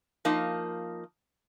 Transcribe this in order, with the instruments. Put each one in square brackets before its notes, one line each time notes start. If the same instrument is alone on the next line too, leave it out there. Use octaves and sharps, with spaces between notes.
[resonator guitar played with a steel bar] F3 A#3 D#4